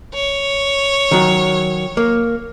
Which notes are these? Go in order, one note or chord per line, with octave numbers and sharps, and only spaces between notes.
C#5
D#3 F#3
A#3